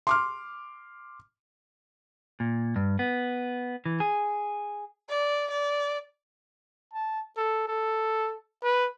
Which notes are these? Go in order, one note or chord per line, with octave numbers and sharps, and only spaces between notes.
C6 D6 F6
A#2
G2
B3
E3
G#4
D5
D5
A5
A4
A4
B4